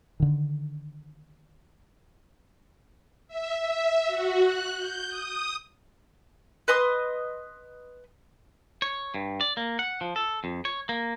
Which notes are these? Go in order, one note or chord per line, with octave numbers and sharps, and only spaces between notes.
D3 D#3
E5
E5
F#4
F#6
G6
D#6
B4 D#5 C6 D#6
C#5
G2
D5
A#3
F#5
F3
A4
F2
C#5
A#3